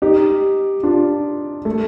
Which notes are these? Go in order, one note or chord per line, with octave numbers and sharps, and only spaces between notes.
D#4 G4
D4 F4
A3